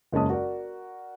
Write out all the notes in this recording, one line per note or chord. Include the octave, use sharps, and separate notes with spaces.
F#1 G#3 A#3 C#4 A5 D#6
F#4 A#4 D5